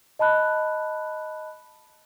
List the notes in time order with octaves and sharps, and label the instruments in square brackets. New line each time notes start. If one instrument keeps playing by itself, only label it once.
[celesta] D#5 A5 B5 F#6